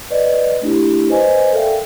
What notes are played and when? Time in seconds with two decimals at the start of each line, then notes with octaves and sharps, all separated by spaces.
0.10 B4 D5 D#5
0.62 A3 D4 E4 G4
1.09 B4 C5 D#5 G#5
1.52 A4 A#4 D5 E5 F5 G5